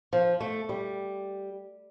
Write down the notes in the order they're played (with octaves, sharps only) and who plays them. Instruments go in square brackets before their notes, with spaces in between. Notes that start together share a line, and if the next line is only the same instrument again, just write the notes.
[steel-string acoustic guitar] F3
A3
G3